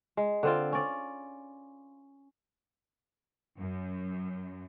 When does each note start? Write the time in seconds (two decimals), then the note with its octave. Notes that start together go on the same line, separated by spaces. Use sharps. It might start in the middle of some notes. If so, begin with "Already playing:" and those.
0.17 G#3
0.43 D3 C4 F4
0.73 C#4 D5
3.58 F#2